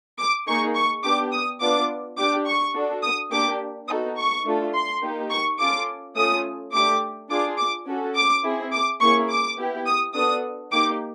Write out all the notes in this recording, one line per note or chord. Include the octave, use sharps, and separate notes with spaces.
D6
A#3 D#4 G#4 C#6
C#6
B3 D4 G4 D6
D#6
B3 D4 F4 D6
D4 G4 D6
C#6
D4 F#4 A4
D#6
A#3 D4 G4 D6
B3 D#4 F#4 A4 D#6
C#6
A3 D4 F4 A4
C6
A#3 D#4 G4
C#6
C#4 F4 A4 D6
A3 C#4 F4 D#6
A3 D4 G4 D6
D4 F4 G#4 D6
D6
C#4 F#4 A4
D6
C4 E4 G#4
D6
A#3 C#4 E4 G#4 C#6
D6
B3 E4 G4
D#6
B3 D4 F#4 A4 D#6
A#3 D#4 G4 D6